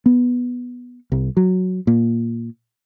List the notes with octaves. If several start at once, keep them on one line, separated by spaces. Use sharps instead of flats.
B3
C2
F#3
A#2